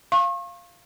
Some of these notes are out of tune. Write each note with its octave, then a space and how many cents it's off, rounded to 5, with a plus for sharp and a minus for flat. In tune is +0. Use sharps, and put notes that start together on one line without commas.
F5 -5 C#6 -40